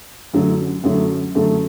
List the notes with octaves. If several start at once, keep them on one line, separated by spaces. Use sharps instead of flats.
F#2 D3 F#3 A3
F#2 D3 F#3 A3
F#2 D3 F#3 A3